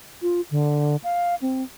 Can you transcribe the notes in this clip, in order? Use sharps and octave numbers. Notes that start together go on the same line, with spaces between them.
F4
D3
F5
C4